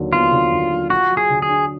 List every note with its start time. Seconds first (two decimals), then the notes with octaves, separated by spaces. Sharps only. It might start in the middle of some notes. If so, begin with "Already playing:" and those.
Already playing: D#2 D3 F#3
0.13 B3 F4
0.32 D3
0.52 D#2
0.71 F#3
0.90 F4 F#4
1.10 F#3
1.17 G#4
1.30 D3
1.42 G#4
1.49 D4